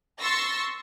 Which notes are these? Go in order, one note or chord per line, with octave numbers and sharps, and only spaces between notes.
C6 C#6 E6 A6 A#6